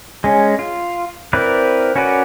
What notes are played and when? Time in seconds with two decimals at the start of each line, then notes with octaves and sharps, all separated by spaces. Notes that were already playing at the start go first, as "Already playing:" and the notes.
0.24 G#3 C#4
0.59 F4
1.33 C4 E4 A#4 B4 D5
1.96 C#4 F#4 A#4 B4 D5